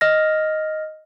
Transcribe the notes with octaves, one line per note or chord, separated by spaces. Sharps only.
D#5 F6 A#6